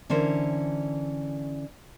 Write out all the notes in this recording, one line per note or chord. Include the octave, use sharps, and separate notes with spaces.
D3 E3 C#4 A#4 C5